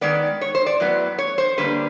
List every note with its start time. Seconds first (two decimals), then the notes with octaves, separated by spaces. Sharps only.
0.01 D#3 G#3 B3 D5
0.41 C#5
0.55 C5
0.66 D5
0.80 A2 F#3 B3
1.18 C#5
1.38 C5
1.58 D3 G3 A#3 B4